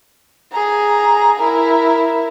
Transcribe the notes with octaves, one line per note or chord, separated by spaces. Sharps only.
G#4 A#5
E4 A#4